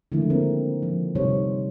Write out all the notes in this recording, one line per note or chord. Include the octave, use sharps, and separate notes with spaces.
D3 D#3 F3 G#3 A3 E4
A#3 C4 A#4
F3
C3 G3 D#4 C5 C#5